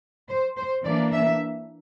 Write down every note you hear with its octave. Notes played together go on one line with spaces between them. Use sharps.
C5
C5
E3 A#3 D4 D5
E5